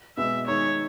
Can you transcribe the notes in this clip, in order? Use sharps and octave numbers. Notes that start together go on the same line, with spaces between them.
B2 G#3 B3 E5
D#3 G#3 D#4 C#5